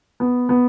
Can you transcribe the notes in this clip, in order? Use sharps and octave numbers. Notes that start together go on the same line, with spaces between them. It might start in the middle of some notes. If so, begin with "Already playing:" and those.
B3
B3